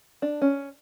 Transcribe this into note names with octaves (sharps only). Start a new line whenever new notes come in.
D4
C#4